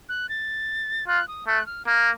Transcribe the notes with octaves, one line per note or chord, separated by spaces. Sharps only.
F#6
A6
F4 F#6
D#6
A3 F#6
F6
A#3 F6